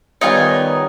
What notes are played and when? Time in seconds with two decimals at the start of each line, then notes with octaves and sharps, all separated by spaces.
0.21 D#3 G3 B3 D#4 F4 C#5 G#5